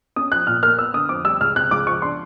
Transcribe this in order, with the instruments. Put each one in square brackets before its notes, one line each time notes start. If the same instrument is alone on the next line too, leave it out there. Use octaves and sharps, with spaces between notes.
[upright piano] C#4 D#6
F3 F#6
A#2 F6
A#3 F6
B3 E6
D3 D#6
F2 D6
G3 E6
C#2 F6
C3 F#6
C#2 D6
F3 C#6
D4 C6